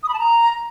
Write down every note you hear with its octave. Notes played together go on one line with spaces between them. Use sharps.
D#6
B5
A5
A#5